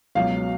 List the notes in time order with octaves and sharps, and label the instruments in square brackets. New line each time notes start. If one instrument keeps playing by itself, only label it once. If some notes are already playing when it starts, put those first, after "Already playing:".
[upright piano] C#2 B2 F#3 F5